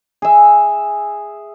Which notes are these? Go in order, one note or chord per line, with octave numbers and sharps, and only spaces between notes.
G#4 E5